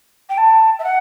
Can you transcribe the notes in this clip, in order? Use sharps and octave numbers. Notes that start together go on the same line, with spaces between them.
G5
A5
E5
F#5